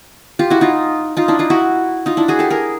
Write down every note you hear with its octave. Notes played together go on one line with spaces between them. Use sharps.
F4 G4
E4 F#4
D#4 F4
D#4 F4
D4 E4
D#4 F4
E4 F#4
D#4 F4
D4 E4
F#4 G#4
G4 A4
G#4 A#4